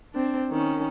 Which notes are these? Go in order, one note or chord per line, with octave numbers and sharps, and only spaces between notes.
C4 D4
D#3 C#4